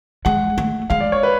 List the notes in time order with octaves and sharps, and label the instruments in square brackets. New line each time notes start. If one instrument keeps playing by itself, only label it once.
[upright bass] G#3 [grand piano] F#5
[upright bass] A3
[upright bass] G#3 [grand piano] F5
[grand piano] D5
C#5
B4